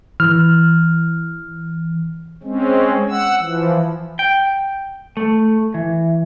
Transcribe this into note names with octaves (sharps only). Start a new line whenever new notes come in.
E3 F6
G#3 C4 C#4
F#5 E6
E3 F3
G5
A3
E3